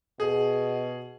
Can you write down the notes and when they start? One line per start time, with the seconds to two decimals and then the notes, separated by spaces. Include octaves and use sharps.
0.20 B2 G#4